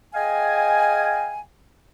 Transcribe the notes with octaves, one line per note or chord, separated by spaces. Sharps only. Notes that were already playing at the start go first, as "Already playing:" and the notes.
G#4 D#5 F5 G5 G#5